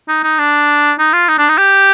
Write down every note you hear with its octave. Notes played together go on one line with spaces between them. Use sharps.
D#4
D#4
D4
D#4
F4
D#4
D4
D#4
G4